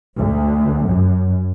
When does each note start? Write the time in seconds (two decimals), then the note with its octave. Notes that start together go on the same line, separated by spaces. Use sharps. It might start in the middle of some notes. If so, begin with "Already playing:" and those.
0.16 D2
0.87 F#2